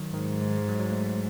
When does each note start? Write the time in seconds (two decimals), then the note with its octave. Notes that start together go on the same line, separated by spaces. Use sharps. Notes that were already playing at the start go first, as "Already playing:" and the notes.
Already playing: D#3 F#3
0.13 G#2 D#3
0.58 G#3
0.69 F#3
0.79 F#3
0.91 A3